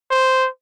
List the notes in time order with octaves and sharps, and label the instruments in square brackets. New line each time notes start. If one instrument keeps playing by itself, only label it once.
[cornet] C5